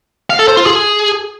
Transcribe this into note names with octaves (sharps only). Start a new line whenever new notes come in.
F5
A4
C5
F4
G#4